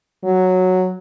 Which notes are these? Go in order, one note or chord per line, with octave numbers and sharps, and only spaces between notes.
F#3